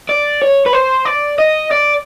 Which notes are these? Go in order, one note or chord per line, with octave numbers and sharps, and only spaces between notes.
D5
C#5
B4
C5
D5
D#5
D5